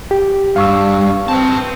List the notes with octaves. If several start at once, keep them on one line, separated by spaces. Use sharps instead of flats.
G4
G2 F5 C#6 E6
C4 B4 A5